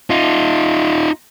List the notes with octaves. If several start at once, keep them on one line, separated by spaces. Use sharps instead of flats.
D#4 F4